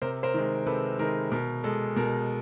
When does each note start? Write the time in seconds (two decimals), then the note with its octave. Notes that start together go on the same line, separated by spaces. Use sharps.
0.02 C3 A#4 C5
0.23 A#4 C5
0.34 D#3 G#3
0.66 C3 A4 B4
0.99 D#3 G#3 A#4
1.32 B2 A#4
1.64 G#3 A4
1.96 B2 A#4